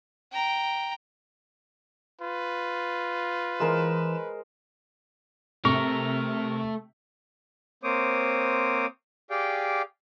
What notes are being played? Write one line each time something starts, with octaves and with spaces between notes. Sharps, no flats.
G5 A#5
F4 B4
E3 G#3 A#4 C5 E7
C3 A3 A#4 C#6
A#3 C4 C5 C#5 D6 D#6
G4 G#4 D5 F5 G5